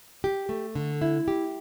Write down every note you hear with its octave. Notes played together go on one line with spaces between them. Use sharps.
G4
A3
D3
E4
G4